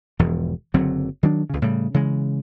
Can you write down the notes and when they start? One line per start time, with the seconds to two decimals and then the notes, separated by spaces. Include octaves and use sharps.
0.19 E1 E2 G#2 F3
0.74 F#1 D3 F#3 C4
1.23 D#3 F#3 D4
1.50 C#2 C#3
1.62 A2 C#3 G3
1.94 C#3 E3 G#3